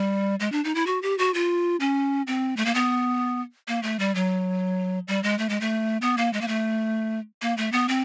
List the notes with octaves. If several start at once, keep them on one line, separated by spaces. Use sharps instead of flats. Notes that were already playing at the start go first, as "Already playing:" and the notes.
Already playing: G3
G#3
D4
D#4
E4
F#4
G4
F#4
F4
C#4
C4
A3
A#3
B3
A#3
A3
G3
F#3
G3
G#3
A3
G#3
A3
B3
A#3
G#3
A#3
A3
A#3
A3
B3
C4